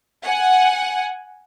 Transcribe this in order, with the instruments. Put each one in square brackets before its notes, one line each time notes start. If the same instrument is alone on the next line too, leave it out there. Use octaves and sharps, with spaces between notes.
[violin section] F#5 G#5